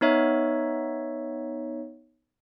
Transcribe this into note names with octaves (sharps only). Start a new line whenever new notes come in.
B3 D#4 C#5 E5